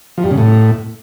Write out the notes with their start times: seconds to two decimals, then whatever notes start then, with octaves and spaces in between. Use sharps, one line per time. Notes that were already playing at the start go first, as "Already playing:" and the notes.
0.18 F3
0.24 G2
0.31 C#3
0.38 A2